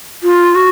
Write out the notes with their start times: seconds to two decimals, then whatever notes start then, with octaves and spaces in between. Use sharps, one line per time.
0.23 F4
0.55 F#4